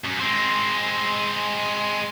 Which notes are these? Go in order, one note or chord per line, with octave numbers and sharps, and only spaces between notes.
F#2
G#3 C4